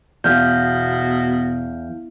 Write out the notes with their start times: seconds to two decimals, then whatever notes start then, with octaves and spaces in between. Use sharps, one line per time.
0.24 E2 B2 F5 F6 G6